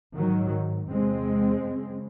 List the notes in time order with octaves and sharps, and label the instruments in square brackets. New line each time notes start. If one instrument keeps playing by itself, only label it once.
[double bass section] G#2 D#3 F#3
E2 C3 G#3 C4
F#2 C#3